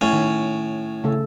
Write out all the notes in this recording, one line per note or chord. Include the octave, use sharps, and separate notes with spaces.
A2 C#4
D#3
C#3 A3 A4